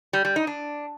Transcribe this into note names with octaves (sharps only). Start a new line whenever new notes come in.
G3
G3
D#4
D4